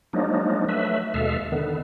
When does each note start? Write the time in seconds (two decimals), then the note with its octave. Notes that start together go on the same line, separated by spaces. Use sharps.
0.13 F3 F#3 G#3 A#3 D4 D#4
0.69 F#3 A3 B4 E5
1.14 D#2 B2 G#3 A4 E5 F5
1.52 D3 D#3 B3